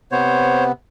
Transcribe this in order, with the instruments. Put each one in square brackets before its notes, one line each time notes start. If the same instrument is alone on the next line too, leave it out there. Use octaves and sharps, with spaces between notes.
[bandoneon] C3 B3 [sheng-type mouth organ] C5 C#5